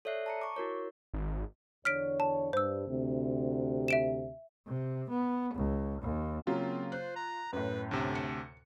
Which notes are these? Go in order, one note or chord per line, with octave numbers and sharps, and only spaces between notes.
A4 C#5 D5 E5 F#6 C7
A5 A#5 C#7
C#6 D6
E4 F#4 A#4 C#5
G#1
E2 D3 C#5 F6 B6 D7
A5
G2 C5 E6
D2 C3
E5 D7 E7
C3
B3
C#2
D#2
C#3 F#3 A#3 C4 F4
C5 F#6
A#5
F#2 A2 B4
D2 C3 D4
C#7